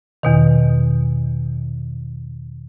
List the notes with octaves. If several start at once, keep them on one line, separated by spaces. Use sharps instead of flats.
E2 B2 D#3